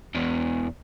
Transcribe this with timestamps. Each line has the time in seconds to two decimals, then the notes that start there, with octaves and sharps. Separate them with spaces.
0.15 E2 B2